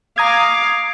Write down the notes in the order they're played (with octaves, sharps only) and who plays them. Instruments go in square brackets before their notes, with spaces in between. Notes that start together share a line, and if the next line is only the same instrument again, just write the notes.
[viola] F5 D6 [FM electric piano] A#5 D#6 G#6